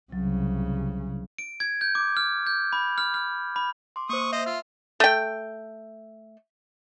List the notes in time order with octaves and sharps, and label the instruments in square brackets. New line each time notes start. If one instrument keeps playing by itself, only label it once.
[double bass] C2 C#3 [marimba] F#3
[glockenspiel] D7
G#6
G6
D6
F6
G6
B5
F6
F6
B5
[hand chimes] C6 D6
[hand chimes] A#3 C5 [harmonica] C#6 D#6
[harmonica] C5 D#5 [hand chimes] E5
[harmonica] F4 [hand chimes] E6
[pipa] A3 G5